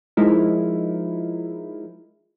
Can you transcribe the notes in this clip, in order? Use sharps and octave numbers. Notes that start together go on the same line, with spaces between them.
F3 G#3 D#4 E4 A#4